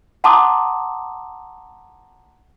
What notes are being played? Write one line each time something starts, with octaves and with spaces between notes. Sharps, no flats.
F#5 A5 A#5 C6 D6 D#6